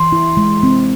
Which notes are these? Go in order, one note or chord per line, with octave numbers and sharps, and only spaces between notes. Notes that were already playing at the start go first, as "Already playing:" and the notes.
Already playing: E3 C6
E4
G#3
C4